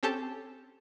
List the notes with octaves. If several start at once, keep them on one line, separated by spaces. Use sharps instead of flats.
C4 C#4 G4 A4 G5 A5